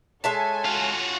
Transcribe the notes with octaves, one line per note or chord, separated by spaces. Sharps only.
G#3 A4 C#5 E5 G#5 A5
F4 F#4